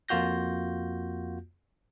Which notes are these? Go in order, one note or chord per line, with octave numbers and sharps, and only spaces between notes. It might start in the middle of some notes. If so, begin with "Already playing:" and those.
F2 A#3 F4 F#4 G6 A#6